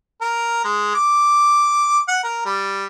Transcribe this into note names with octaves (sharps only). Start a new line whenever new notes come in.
A#4
G#3
D6
F#5
A#4
G3